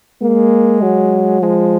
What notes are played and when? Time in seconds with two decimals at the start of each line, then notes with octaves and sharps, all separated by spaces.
0.22 G#3 A#3
0.82 F#3
1.43 F3 G#3